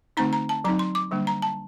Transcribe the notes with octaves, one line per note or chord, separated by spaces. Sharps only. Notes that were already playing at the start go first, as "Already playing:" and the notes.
D3 A3 C4 D#4 A#5
A#5
A5
F#3 C4 D#4 A#5
C6
D6
D3 G3 A#3 D4
A#5
A5